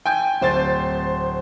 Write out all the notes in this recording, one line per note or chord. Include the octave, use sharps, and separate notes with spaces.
G5 G#5 G6
D1 C5 C6 A6